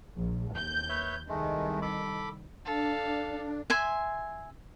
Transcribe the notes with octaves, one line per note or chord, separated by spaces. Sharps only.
A#1
D#2 G6
B4 C#5 E5
C2 D#3 G#3 A3
A4 B5 D6
D4 A4 F5
E5 G#5 C6